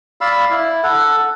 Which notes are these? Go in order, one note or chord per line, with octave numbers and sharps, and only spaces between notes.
D5 F5 B5 E6
E4
A4 F#5